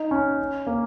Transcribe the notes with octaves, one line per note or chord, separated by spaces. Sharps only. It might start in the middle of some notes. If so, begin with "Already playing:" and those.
Already playing: D#4
C#4
A#3